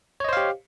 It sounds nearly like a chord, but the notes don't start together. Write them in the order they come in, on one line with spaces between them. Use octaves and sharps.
C#5 D#5 C5 F5 G4